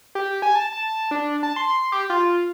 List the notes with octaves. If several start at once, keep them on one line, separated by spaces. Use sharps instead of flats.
G4
G#5
A5
A5
D4
A5
C6
G4
F4